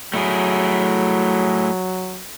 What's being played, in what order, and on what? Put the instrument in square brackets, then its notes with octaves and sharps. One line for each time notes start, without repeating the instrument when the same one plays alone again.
[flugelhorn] F#3 [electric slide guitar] A3 E4 G#4